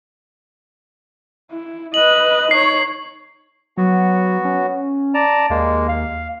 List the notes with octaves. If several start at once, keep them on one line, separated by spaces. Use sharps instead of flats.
E4
B4 D#5 F#7
D#4 C#5 C7
F#3 B3 F#4
C#4
D5 A5 A#5
D#2 G#3 A#3
F5